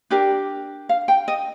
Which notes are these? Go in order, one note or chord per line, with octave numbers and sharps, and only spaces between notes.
D4 G4 A#4 D5
F5
G5
D#5